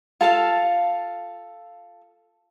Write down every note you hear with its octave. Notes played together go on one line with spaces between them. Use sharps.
F4 A4 F5 A5